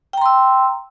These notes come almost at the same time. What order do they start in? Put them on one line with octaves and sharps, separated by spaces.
G5 A#5 C6 E6